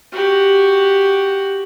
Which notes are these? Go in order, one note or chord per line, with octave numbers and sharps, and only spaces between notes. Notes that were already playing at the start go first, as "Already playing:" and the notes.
F#4 G4